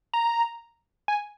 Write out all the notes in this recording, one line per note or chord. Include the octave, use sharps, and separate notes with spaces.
A#5
G#5